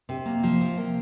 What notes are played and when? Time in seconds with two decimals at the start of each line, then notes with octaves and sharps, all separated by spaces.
0.09 C3
0.26 A#3
0.43 F3
0.61 C3
0.77 A#3